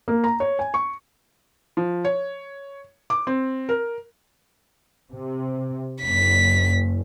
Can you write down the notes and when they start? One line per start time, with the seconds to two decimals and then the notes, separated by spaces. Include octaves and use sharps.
0.08 A#3
0.24 A#5
0.40 C#5
0.59 G#5
0.74 C#6
1.77 F3
2.05 C#5
3.10 D6
3.27 C4
3.69 A#4
5.13 C3
6.03 F#1 B6